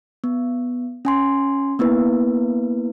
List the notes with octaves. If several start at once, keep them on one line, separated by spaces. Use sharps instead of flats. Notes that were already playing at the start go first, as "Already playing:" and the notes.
B3
C#4 G#5 C6
A#3 B3 E4 B4